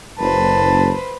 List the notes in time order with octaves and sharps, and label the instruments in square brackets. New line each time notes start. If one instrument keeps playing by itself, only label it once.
[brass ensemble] F#1 [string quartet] B4 C5 [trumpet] A5